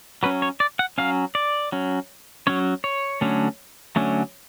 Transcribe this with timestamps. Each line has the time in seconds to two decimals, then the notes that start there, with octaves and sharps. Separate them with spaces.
0.23 F#3 C#4 B4
0.42 C#5
0.60 D5
0.79 F#5
0.98 F#3 C#4 F5
1.35 D5
1.72 F#3 C#4
2.47 F#3 C#4 C#5
2.84 C#5
3.21 D3 F#3 A3 C#4
3.96 D3 F#3 A3 C#4